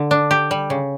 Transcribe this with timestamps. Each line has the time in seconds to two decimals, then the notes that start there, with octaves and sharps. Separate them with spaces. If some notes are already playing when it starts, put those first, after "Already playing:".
Already playing: D3
0.11 D4
0.31 G4
0.51 G3
0.70 C#3